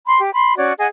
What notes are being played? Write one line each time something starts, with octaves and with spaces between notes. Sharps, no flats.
B5 C6
G4
B5 C6
C#4 F#4 C#5 D5
G#4 D#5 F#5 G#5